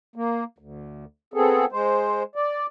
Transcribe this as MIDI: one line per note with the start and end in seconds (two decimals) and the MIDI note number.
0.16 0.44 58
0.58 1.05 38
1.34 1.65 59
1.34 1.65 60
1.34 1.65 68
1.34 1.65 69
1.72 2.23 56
1.72 2.23 72
2.36 2.66 74